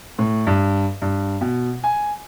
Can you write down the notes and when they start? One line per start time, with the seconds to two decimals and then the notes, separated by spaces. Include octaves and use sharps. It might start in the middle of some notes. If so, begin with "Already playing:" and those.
0.19 A2
0.47 G2
1.02 G2
1.41 B2
1.84 G#5